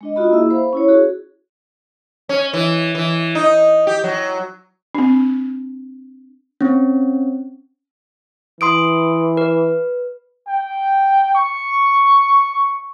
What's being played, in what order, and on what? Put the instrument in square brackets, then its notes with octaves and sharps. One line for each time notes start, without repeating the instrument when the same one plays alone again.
[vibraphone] G#3 D4 D#5
D#4 F4 F#4 D#5 B5
A#3 E4 G#4 E5 E6
C5 F5 B5
C#4 E4 C#5
F#4 G#4
[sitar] C#4
E3
E3
D#4
G4
F#3
[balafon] C4 D4
[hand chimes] C4 C#4
[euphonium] E3 [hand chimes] C6 D#6 D7
[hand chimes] B4
[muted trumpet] G5
C#6